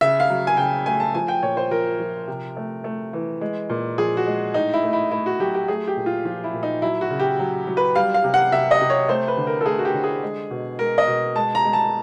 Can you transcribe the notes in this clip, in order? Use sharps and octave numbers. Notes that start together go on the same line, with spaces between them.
C#3 E5
F5
F#3
G#5
C#3 G5
A3 G#5
A5
F3 G#5
G5
A#2 C#5
C5
F3 A#4
F3
C3
A3
A3
E3
G#3
A#2
F3 G#4
F#4
G#3
A2 D#4
E4
A3
E4
A3 E4
F#4
F#3 G4
G4
A3 G#4
G4
A#2
F4
F3 F4
E4
A#2
D#4
F#3 E4
F#4
C#3
G4
F#3
F#3
B4
G3 F5
F5
C3
F#5
C3 E5
D#5
C3
C#5
A3 C5
B4
D3
A#4
A4
A3 G#4
F#4
G4
D3
G#4
G#3
B2
G#3 A#4
D#5
B2
G#3 A5
A#5
G#3
A5